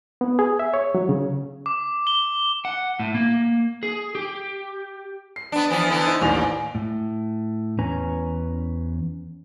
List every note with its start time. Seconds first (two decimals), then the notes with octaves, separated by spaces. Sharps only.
0.21 B3
0.39 G#4
0.59 E5
0.74 C#5
0.95 F#3
1.09 C#3
1.66 D6
2.07 G7
2.65 F#5
3.00 A2
3.15 A#3
3.83 G#4
4.15 G4
5.36 C7
5.52 B3 D4
5.70 E3 F3 B3
5.89 D3 E3 B3
6.06 D#4 C5
6.21 A1 D#2 A#2 F7
6.75 A2
7.79 E2 C#4 B4 G#5 A#5